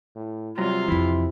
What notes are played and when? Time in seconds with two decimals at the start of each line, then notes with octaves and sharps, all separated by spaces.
0.16 A2
0.58 C3 F#3 G3 F4 A#5
0.88 F2 E3 E4 B5